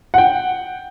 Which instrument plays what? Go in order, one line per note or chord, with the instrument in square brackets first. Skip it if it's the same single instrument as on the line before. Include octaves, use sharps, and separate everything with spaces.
[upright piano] F#5 G5